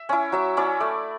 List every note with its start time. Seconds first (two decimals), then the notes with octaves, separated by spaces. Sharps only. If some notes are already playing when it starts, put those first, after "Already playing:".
Already playing: E5
0.09 C#4 E4
0.32 F#3 E5
0.57 C#4 E4 D5
0.80 A3 D5